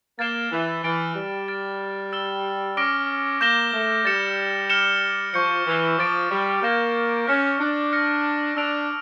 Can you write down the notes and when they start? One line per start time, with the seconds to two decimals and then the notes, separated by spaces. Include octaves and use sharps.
0.19 A#3 A6 E7 G7
0.51 E3
0.83 E3 F6 A6 D7 G7
1.15 G3
1.48 F6 A6 D7
2.13 E6 A6 E7 G7
2.76 C#4 D6 F6 A#6 D7 G7
3.41 A#3 D6 G6 A#6 E7 G7
3.73 A3
4.05 G3 A6 C#7 E7
4.70 F6 C#7 E7 G7
5.34 F3 C#6 G6 C#7
5.66 E3
5.98 F3 D6 A6 D7
6.31 G3
6.62 A#3 G6 A#6 E7 G7
7.27 C#4 F6 C#7 E7
7.59 D4
7.92 C#6 F6 A#6 C#7
8.57 D4 E6 A#6 D7 F7